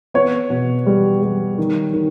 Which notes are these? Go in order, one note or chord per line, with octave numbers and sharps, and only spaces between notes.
B3 C#5
B2
G3
G3
D#3
D#3